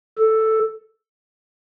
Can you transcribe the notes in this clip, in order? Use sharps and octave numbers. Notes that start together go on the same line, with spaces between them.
A4